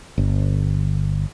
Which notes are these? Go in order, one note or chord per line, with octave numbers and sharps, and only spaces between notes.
G1